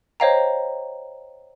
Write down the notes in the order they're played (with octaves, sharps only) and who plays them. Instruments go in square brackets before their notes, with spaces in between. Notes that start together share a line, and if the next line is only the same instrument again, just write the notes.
[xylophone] C5 C#5 D#5 F5 G5 A#5